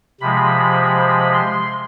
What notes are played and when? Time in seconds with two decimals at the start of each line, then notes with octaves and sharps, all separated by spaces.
0.21 C3 F3 G#3 B5
0.96 B5
1.34 C6